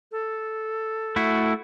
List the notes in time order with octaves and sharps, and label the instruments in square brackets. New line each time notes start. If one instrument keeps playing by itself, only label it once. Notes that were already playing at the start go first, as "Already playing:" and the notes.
[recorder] A4
[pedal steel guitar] A3 E4 F#4